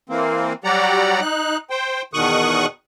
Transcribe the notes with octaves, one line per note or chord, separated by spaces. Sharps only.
E3 A#3 C4
F#3 G3 G4 D5 F#5 A#5
D#4 F#6
C5 G5
E2 B2 D#3 C#6 D#6 F#6